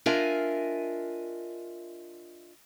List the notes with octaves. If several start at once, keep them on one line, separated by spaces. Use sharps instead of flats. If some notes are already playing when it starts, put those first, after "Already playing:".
D4 F4 A#4 D#5 E5 G#5